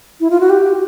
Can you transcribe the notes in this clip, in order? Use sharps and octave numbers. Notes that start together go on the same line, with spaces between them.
E4
F4
F#4
G4